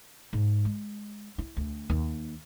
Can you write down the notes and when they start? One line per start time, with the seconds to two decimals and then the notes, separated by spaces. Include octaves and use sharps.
0.33 G#2
0.65 G#3
1.38 E4
1.57 D2
1.90 D#2